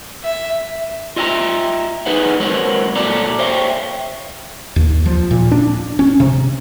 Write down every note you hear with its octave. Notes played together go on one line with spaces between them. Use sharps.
E5
F4 D#5 E5 G5 A#5
D#4 G#4 B4 F#5
F#3 G#3 A#3 C4 C#5 F#5
A#2 A3 F#4 A4 D5 A#5
C5 C#5 E5 F5 G5
D#2
F3
A#2
D4
C#4
C3